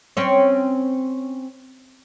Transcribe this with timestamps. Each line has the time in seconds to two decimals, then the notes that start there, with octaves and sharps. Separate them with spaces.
0.17 C4 C#4 C#5